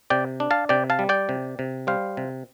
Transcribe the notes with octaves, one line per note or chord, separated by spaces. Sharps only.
C3 D5 G5
D4
F5 A5
C3 D5 G5
F5 A5
G3
D5 G5
C3
C3
G3 C5 F5
C3